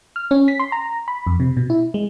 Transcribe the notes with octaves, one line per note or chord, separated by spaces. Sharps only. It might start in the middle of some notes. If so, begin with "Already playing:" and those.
F6
C#4
B6
C6
A#5
B5
F2
C3
B2
E4
G#3